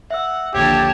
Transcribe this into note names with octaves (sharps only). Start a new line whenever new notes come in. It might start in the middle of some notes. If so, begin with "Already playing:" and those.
E5 F#5 E6
A#1 D#2 D3 G4 C#5 A5